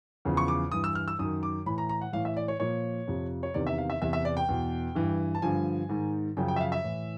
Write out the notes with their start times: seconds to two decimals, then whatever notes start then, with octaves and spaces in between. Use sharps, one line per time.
0.25 E2 C#3 F3
0.37 C#6
0.48 D6
0.72 G2 E3 D#6
0.84 E6
0.95 F6
1.08 E6
1.19 F#2 D#3 D#6
1.43 D6
1.66 A2 E3 B5
1.78 A#5
1.89 A#5
2.01 F#5
2.13 A2 E3 F5
2.25 E5
2.37 D5
2.48 C#5
2.60 A#2 F3 C#5
3.07 F2 C3 F3
3.43 C#5
3.54 E2 C3 D#3 D5
3.67 E5
3.78 F5
3.90 E5
4.02 E2 C3 E3 E5
4.13 E5
4.25 D5
4.37 G5
4.48 E2 B2
4.95 G2 E3
5.35 A5
5.42 G2 D3 F3 G#5
5.89 G#2 D#3
6.37 F#2 C#3 F3 G5
6.48 G5
6.56 E5
6.61 F5
6.72 E5
6.84 A2 E3